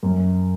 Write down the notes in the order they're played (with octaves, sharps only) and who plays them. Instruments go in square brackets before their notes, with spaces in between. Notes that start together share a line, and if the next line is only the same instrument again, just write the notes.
[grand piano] F#2